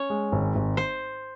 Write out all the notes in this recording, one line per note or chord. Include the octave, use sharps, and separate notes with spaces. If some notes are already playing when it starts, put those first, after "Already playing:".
Already playing: C#4 C#5
G#3
G#1
G#1
C5